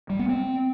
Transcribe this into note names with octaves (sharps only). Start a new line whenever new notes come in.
G3
B3
C4